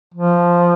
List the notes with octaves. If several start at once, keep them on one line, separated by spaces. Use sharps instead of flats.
F3